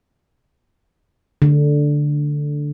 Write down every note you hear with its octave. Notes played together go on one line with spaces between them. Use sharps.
D3